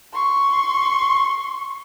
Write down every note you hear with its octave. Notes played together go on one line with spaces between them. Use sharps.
C6 C#6